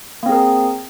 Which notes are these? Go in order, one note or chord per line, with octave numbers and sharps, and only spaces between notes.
A#3 C4 G#4 A#4